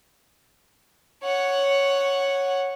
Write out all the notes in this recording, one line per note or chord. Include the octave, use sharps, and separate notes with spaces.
C#5 F#5